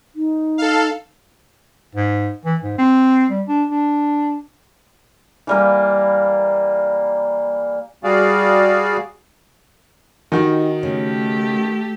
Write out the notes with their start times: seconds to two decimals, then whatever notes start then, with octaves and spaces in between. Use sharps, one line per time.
0.15 D#4
0.58 A4 F5
1.95 G#2
2.45 E3
2.62 G#2
2.78 C4
3.30 G3
3.48 D4
3.70 D4
5.47 E3 G3 A#3
8.04 G3 F#4 G#4 D5 F5
10.32 D#3 D#4 F#4 G4 G#5
10.83 C#3 A3 G4